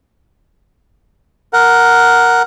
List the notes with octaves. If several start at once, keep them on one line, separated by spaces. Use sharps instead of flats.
A#4 F#5